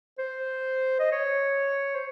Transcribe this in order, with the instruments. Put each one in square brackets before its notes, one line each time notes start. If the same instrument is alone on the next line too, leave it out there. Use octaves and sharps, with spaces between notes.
[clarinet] C5
D#5
C#5
C5